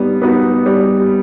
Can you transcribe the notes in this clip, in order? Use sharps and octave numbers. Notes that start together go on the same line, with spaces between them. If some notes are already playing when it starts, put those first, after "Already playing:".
Already playing: G3 B3 D#4
B3 D#4 F#4 B4
G3